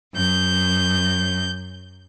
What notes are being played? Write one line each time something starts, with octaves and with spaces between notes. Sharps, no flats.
F#2 G6